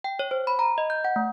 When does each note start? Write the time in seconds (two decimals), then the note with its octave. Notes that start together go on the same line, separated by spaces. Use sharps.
0.04 G5
0.19 C#5
0.31 C5
0.47 B5
0.59 A#5
0.78 D#5
0.90 G6
1.04 F#5
1.16 A3